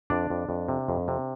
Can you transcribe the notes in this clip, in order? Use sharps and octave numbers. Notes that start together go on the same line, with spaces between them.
F2 D4 D5
F2
F2
C3
F2
C3